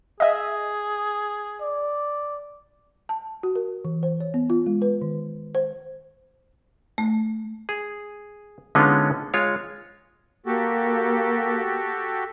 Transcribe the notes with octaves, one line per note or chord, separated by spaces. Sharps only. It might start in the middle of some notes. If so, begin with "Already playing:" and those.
G#4 D#5 E5
D5
A5
F#4
A#4
E3
C5
C#5
B3
F4
G#3
B4
D#3
C5
A3
G#4
D3 G#3 B3 C#4 D#4 F4
G#3 F4 C#5
A#3 F#4 G4 A4